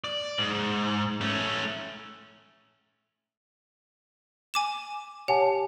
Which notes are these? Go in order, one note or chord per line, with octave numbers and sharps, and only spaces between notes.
D5
G#2
A3 C#4
G#5 D6 E7
G4 C#5 F#5 G#5 A5